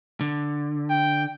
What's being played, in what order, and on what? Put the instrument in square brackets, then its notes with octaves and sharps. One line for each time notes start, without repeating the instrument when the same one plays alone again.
[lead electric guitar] D3
[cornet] G5